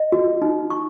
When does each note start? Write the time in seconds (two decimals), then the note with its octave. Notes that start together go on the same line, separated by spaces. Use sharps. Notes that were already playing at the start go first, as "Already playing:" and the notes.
Already playing: D#5
0.12 F#4
0.42 D#4
0.70 C#6